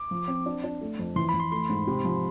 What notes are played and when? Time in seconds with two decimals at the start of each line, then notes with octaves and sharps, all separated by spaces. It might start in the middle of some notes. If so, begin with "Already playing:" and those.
Already playing: D6
0.11 F3
0.28 C4
0.46 D4
0.64 D4
0.81 A3
0.99 F2
1.16 E3 C6
1.29 B5
1.34 E3
1.40 C6
1.52 A3 C6
1.69 G#2
1.87 C3
2.05 F3